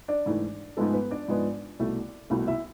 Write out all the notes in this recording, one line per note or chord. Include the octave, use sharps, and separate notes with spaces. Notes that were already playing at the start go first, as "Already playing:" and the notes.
D4 D5
G#2 E3 A3
G#2 F3 G#3 A3 B3 A4
B3 B4
D4 D5
G#2 F3 G#3 B3
C2 B2 A3
C2 B2 A3
E4 E5